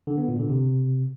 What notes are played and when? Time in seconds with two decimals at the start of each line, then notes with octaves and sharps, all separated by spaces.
0.07 D3
0.18 B3
0.28 A#2
0.39 D3
0.50 C3